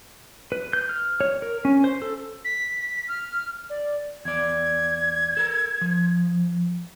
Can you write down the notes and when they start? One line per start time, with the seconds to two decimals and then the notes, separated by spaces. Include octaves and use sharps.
0.52 B4
0.73 G6
0.89 F6
1.21 C#5
1.42 A#4
1.65 C#4
1.84 C5
2.02 A4
2.45 B6
3.08 F6
3.70 D5
4.25 E2 D5 G#6
5.37 A4 A#4
5.81 F3